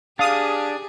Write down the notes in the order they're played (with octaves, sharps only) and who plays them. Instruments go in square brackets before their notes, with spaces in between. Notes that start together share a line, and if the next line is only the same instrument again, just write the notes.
[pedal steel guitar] D4 [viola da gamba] G4 G#4 [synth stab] F5 D#6